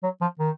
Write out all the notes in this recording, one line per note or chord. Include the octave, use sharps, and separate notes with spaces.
F#3
F3
D#3